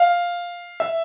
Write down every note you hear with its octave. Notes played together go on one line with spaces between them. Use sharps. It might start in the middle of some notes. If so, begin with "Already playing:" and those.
Already playing: F5
E5